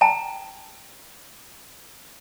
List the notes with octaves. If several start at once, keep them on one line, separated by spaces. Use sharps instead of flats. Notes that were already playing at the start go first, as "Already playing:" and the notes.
G5 A5 A#5